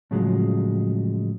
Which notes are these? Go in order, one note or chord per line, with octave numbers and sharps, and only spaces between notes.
A2 C#3 F3 F#3 G#3